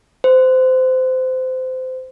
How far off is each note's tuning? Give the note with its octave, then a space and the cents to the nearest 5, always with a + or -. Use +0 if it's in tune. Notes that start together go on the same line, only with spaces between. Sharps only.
C5 -25